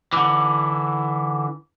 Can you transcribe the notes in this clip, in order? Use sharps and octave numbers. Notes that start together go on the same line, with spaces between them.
D3 E3